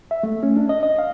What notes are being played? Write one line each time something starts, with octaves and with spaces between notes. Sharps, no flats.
E5
A3
C#4
D4
D#5
D#5
F5